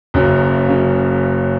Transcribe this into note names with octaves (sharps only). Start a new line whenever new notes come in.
F#1 F#2 C#3 F#3
C#3 F#3